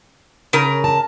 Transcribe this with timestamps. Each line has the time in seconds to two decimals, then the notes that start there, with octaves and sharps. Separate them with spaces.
0.53 C#3 A#4
0.84 A5